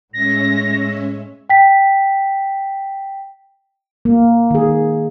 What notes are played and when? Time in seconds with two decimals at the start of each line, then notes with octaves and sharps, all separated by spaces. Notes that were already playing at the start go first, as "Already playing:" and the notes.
0.14 A2 G#3 C#4 C#5 E5 A#6
1.50 G5 B6
4.05 A#3
4.51 D#3 G#4